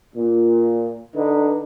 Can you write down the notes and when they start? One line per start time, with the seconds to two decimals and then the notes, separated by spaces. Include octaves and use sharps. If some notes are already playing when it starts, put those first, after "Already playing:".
0.15 A#2
1.15 D3 D#4 B4